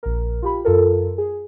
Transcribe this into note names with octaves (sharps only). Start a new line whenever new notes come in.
A#1 A#4
F4 G4 B5
F#2 F4 A4 A#4
G#4